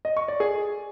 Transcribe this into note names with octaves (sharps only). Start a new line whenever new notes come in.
D#5
C#6
D5
G#4